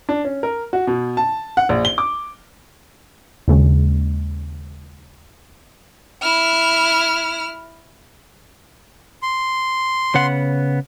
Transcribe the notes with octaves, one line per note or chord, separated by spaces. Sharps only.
D4
C#4
A#4
F#4
B2
A5
F#5
A#1
G7
D6
D#2 C#3 G#3
E4 F6
C6
C#3 B3 F#5